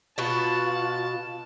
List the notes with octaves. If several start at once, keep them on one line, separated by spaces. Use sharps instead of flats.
B2 F4 F#4 A5